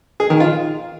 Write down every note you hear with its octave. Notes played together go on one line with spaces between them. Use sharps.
G#4
D#3
F4